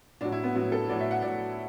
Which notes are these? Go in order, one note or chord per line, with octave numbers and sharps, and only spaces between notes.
A2 F#3 D4
E4
B3
A2 F#3 B3
A4
A2 F#3 D5
E5
F#5
A2 F#3 D5